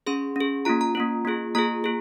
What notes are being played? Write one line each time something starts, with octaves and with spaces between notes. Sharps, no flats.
C#4 G#4 C6
C#4 G#4
A#3 C#4 F4 A#5
A#5
A#3 C#4 F4
A#3 F4 G#4
A#3 F4 G#4 A#5
F4 G#4